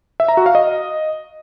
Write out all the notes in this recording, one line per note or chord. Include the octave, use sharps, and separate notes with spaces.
E5
A#5
F#4
F5
D#5